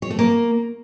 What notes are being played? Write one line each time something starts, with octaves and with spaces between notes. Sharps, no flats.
C#5
A3
A#3